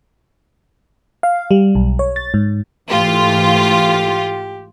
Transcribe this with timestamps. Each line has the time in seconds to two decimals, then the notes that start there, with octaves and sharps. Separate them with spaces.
1.23 F5
1.51 G3
1.75 B1
1.99 C#5
2.16 A6
2.34 G#2
2.91 G#2 E3 A3 F4 G4